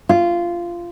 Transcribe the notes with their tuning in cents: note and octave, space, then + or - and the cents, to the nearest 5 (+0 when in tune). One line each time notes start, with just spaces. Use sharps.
F4 -15